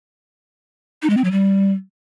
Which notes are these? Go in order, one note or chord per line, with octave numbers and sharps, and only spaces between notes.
D#4
G#3
C4
F#3
G3